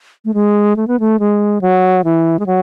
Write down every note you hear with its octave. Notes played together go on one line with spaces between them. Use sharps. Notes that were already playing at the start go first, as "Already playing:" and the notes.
A3
G#3
A3
B3
A3
G#3
F#3
E3
G#3
F#3